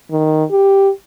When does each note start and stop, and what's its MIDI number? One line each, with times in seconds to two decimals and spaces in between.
0.11 0.44 51
0.51 0.90 67